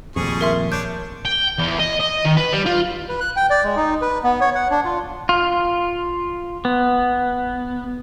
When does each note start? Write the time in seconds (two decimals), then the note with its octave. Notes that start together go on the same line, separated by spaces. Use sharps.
0.16 D#1 A#1 F2 G3 A3 G#4 C#6
0.41 A#4 E5 C6
0.72 D4 C#5 G6
1.25 G5
1.58 E2
1.79 D#5
2.00 D#5
2.25 D#3
2.37 B4
2.52 G3
2.66 F4
3.09 B4
3.20 F#6
3.36 G5
3.50 D5
3.64 G#3
3.76 D#4
4.02 B4
4.23 B3
4.41 C#5
4.55 F#5
4.71 D4
4.85 F4
5.29 F4
6.65 B3